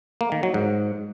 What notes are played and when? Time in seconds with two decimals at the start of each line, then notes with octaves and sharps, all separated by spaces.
0.21 A#3
0.32 D#3
0.43 F#3
0.54 G#2